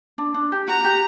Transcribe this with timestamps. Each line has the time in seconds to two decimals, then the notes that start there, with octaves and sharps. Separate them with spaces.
0.18 D4
0.34 D4
0.52 G4
0.68 F#4 A#5
0.81 F#4
0.85 G4